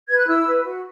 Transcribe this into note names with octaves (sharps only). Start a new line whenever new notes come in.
B4 G#6
F#6
E4 E6
B4
F#4